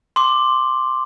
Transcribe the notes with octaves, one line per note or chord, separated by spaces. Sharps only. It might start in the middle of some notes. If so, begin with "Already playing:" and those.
C6 D6